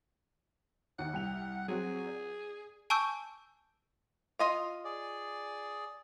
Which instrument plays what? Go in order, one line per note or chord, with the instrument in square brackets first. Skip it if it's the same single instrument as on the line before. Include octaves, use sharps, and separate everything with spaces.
[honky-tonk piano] D#2 C#7 [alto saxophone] F#5
[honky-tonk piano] C2 G5 F7
[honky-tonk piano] F#3 C4 F#4 [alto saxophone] G#4
[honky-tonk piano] D5
[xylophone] G#5 A5 C#6 D6 E6 G6
[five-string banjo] F4 D#5 F5
[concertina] G#4 D5